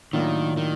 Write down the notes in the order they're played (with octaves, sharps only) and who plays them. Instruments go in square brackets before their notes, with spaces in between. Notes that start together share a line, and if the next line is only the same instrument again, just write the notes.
[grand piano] A2 F#3 A#3 D4 F4 [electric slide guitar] D#3
[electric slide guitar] D#3